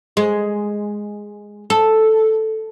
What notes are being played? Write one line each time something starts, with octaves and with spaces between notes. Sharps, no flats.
G#3
A4